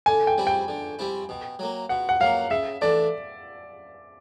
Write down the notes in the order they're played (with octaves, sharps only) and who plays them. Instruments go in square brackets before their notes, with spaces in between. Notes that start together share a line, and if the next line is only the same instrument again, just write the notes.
[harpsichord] D3 [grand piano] G#5
[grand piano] G5
[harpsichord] G3 C4 E4
[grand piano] G5
[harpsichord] D3
G3 C4 E4
B2
F#3 A#3
[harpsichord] B2 [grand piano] F#5
[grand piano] F#5
[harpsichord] F#3 A#3 [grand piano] F5
[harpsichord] C#3 [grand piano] E5
[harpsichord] E3 A3 D4 [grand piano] D5